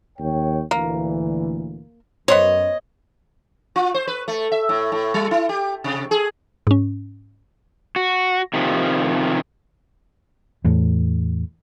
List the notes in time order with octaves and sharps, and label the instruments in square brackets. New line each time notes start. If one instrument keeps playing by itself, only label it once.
[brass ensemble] D#2 C#5 G5
[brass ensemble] D2 A#2 E3 [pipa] A#3
[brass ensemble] F#2 [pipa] B3 C5 C#5 [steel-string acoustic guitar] D#5
[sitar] F4
C5
B4
A3
E5
A2
A2
G3
E4
G4
C3
G#4
[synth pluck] G#2 C#4
[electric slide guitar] F#4
C3 D#3 F3
[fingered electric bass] E2 A2